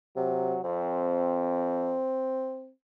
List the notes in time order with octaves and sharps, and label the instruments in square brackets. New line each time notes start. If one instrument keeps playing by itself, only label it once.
[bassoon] C3 [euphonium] F#3
[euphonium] F2 [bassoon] C4